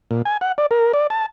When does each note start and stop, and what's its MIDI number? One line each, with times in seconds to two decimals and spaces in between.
0.11 0.22 46
0.25 0.37 80
0.41 0.52 78
0.58 0.66 74
0.71 0.92 70
0.93 1.07 74
1.10 1.26 81